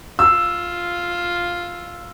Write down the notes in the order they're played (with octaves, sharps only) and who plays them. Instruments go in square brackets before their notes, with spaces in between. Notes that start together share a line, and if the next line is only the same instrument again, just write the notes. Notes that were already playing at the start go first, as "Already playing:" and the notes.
[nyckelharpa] F4 [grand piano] E6